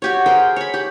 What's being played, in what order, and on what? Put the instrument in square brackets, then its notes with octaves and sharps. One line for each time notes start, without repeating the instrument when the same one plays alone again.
[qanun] F#4 G4 C#5
G#4 A#4 C5 G5
C#5 B5
G4